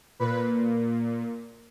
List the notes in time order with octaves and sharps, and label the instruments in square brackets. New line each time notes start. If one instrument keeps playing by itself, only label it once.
[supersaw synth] A#2 B4